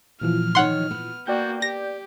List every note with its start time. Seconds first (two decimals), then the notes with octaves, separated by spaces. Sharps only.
0.22 A#2 E3 F3 F6
0.55 D#3 C#5 F#5 C6
0.91 B3
1.27 A#3 F#4 D5 G5 G6
1.62 G4 A#6